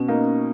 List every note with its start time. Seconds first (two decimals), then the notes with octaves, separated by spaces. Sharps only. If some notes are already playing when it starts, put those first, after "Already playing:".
Already playing: B2 C#4
0.08 A#3 D#4